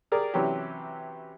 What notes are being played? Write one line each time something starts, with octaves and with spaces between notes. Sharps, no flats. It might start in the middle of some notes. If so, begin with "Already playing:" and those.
G4 G#4 A#4 D5
C3 E3 F#3 C#4 G4